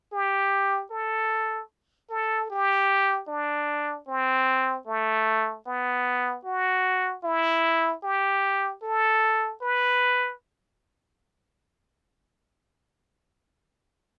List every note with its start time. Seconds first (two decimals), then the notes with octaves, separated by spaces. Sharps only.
0.13 G4
0.91 A4
2.10 A4
2.50 G4
3.28 D4
4.07 C4
4.87 A3
5.66 B3
6.45 F#4
7.24 E4
8.03 G4
8.82 A4
9.62 B4